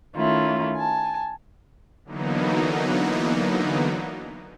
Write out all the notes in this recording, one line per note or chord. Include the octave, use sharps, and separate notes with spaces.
D#3 A3 C#4 E4 F4
G#5 A5
D3 E3 F#3 A#3 B3 D#4